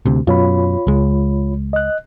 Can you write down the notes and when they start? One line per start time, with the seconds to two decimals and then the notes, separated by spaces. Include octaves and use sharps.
0.06 D2 C3
0.27 F#2 B2 F4 C#5 B5
0.87 C#2 G#3
1.73 D#5 F#6